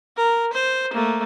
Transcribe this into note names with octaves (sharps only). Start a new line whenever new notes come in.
A#4
C5
A3 A#3